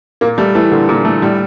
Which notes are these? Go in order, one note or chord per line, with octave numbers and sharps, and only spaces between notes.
A#2 A#3
G3 A3
E3 A3
A#2 D3
A#2
E3
A3
A2 G3